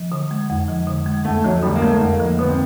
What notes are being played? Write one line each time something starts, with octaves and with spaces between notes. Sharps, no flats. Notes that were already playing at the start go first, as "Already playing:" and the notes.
Already playing: F3
D3
G#3
F2
F3
D3
G#3
F2 A3
F3 F#3
D3 G3
A#3
G#3 A3
F2 A#3
F3
D3 B3
C4